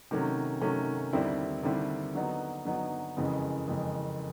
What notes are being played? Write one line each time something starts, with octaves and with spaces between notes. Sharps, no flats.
C3 D#3 F#3 A3 C#4
C3 D#3 F#3 A3 C#4
D#2 D3 G3 C4 E4
D#2 D3 G3 C4 E4
D3 F#3 B3 D#4
D3 F#3 B3 D#4
F#1 F2 C#3 E3 G#3
F#1 F2 C#3 E3 G#3